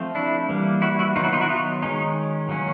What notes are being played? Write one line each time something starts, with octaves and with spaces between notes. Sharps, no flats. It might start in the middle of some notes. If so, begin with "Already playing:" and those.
Already playing: F3 A3 C4
D4 E4
E3 G3 A#3
E4 F#4
E4 F#4
D#3 F#3 B3 D#4 F4
E4 F#4
D#4 F4
E4 F#4
D#4 F4
D#3 G#3 C#4 D#4
D#3 F#3 A#3 C#4